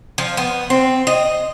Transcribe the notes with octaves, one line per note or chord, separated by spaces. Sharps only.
F3
B3
C4
D#5